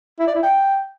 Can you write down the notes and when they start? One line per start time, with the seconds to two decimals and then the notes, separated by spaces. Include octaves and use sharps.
0.19 E4
0.27 D5
0.35 E4
0.43 G5